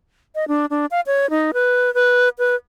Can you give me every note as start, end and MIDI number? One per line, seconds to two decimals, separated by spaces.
0.35 0.45 75
0.48 0.66 62
0.70 0.86 62
0.91 1.01 77
1.07 1.30 73
1.30 1.51 63
1.54 1.93 71
1.94 2.29 71
2.39 2.55 71